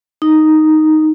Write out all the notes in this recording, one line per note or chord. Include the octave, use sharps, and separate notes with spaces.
D#4